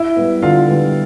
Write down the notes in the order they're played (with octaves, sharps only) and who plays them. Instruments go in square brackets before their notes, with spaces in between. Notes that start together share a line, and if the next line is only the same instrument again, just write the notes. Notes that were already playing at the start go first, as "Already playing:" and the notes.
Already playing: [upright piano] E4 E5
G3 B3
D3 F4 F5
G3 B3